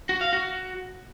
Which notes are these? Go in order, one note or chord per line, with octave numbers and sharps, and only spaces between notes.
F#4
F5
F#4